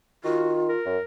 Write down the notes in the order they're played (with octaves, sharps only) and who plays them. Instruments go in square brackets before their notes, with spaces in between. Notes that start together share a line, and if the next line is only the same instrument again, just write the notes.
[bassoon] D#3 [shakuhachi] F4 [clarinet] F#4
[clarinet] A#4
[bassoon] F#2